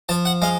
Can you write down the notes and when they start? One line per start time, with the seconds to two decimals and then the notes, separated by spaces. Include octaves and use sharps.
0.09 F3 A5
0.25 F#5
0.42 G#3 F5